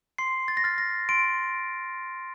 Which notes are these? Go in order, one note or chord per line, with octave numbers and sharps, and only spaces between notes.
C6 C7
A6
A#6
F6 A6
A#6
C6 D7